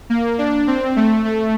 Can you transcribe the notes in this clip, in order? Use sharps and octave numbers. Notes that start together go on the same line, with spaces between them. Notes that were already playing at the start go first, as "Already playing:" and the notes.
A#3
D4
C4
A3
A3